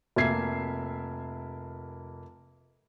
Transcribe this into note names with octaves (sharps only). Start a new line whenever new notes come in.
F1 A#3 A#4 E5 G#6 C7